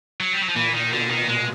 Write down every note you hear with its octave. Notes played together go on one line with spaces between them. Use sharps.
F#3
G3
F#3
F3
A#2 E3
D#3
B2 D3
D#3
G#3